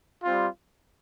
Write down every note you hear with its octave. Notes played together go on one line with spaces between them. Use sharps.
G3 C4 F4